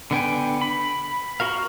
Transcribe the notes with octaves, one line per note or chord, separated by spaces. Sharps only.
D3 B3 G5 G#5
B5
F#4 A#4 F5